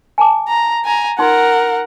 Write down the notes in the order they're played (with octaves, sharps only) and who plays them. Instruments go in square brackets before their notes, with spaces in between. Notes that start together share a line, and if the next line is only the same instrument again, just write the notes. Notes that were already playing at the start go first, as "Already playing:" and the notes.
[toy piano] G#5 A5 D6
[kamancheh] A#5
G#5 A#5
[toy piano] D#4 F4 C6 [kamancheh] A#4 F#5